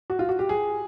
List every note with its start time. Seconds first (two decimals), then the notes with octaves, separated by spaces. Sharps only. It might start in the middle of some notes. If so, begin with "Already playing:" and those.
0.10 F#4
0.19 F4
0.29 F#4
0.39 G4
0.49 G#4